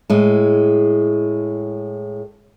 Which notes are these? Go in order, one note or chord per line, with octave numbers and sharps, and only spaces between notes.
A2 G#3